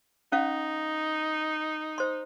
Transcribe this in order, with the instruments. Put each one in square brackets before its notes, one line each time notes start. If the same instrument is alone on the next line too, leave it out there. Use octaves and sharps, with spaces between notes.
[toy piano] C#4 F5 [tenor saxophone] D#4
[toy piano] C5 C6